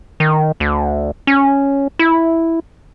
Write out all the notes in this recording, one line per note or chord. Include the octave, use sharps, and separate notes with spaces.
D#3
D2
C#4
E4